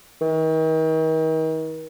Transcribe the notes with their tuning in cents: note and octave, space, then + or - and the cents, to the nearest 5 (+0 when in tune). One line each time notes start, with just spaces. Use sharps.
D#3 +40